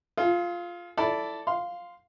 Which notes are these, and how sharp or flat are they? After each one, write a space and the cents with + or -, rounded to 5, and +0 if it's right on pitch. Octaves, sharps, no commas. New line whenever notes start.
F4 +0 G#4 +45
E4 +0 A4 +0 D5 -15
F5 +5 C6 -10